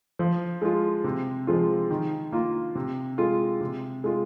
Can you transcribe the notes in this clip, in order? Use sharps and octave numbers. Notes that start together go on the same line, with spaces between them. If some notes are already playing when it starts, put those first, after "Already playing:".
F3
G#3 F4
C3
F3 G#3 F4
D#3
A#3 F4
C3
G#3 F4
C3
G#3 F4